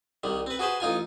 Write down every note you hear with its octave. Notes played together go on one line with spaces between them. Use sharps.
C2 D#3 G3
C4 B4
F#4 G#4 B4 C5
A1 D#4 F4 G#5